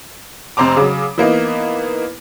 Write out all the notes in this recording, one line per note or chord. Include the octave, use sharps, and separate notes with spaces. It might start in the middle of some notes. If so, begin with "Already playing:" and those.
F1 C4 C5 A#5 D6
C#3 F#3
E3 A#3 B3 D#4